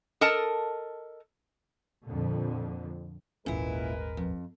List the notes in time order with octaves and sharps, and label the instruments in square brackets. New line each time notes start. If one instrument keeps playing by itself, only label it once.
[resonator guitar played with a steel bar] A4 A#4 D#5 A5
[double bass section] F2 A#2 D3
[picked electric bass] D#1 G#1 C#4 [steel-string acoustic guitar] A#2 E4 [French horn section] G#3 A#4 B4
[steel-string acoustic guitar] F2